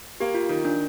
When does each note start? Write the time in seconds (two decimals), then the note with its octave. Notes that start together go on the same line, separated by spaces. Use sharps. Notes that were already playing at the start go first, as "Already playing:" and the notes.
0.20 A#3 G4
0.35 F4
0.49 D#3
0.65 D4